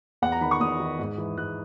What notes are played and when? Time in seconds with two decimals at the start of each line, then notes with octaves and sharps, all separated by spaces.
0.22 E2 F#5
0.32 A#5
0.41 D#3 B5
0.51 C#6
0.60 E2 D#6
0.80 D#3
0.99 G#2
1.18 E3
1.37 G#2 F#6